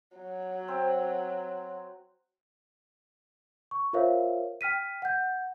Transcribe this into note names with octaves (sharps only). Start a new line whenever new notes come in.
F#3
C4
C#6
F4 A#4 C5 C#5 E5 F5
G5 F6 B6 D#7
F#5 G6